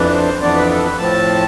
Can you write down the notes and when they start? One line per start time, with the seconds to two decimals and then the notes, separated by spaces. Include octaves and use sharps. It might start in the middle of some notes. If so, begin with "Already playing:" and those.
Already playing: F2 E3 B3 D4
0.13 C5
0.41 F2 E3 B3 D4 D5
0.55 B4
0.71 A4
0.84 B4
0.98 A2 F3 C4 A5